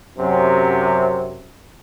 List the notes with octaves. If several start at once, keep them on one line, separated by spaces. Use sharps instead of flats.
F#2 C3